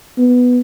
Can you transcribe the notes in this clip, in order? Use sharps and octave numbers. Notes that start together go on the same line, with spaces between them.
B3